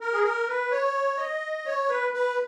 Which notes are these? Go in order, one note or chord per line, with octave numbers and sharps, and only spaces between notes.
A#4
G#4
A#4
B4
C#5
D#5
C#5
B4
B4